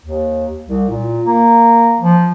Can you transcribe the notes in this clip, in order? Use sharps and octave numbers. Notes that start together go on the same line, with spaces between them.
D#2
C2
A#2
A#3
F3